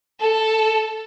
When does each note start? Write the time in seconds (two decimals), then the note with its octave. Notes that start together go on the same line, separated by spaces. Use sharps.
0.20 A4